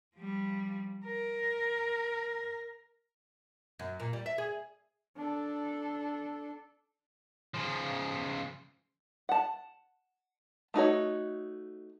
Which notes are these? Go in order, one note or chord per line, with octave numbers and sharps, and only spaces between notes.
F3 G3
A#4
F#2
A#2
G3
E5
G#4
D4 A4
C#3 F3
F#5 A5
A3 D#4 F#4 C#5